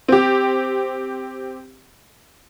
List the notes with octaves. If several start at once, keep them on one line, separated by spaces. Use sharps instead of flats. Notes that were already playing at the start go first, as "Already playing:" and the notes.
C4 G4